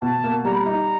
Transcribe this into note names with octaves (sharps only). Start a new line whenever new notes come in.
B2 A5
A#3
G3 A#5
B5
A#5
D#4